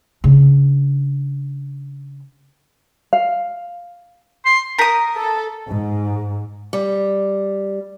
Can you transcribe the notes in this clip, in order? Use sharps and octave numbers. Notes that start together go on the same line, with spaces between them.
C#3 D4
F5
C6
A#4 A#5 D#6 G6 B6
A4
G#2
G3